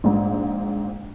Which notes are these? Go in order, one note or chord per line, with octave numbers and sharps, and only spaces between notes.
A#1 G#2